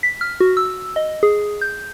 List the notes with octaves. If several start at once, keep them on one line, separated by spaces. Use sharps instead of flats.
B6
F6
F#4
E6
D#5
G#4
G6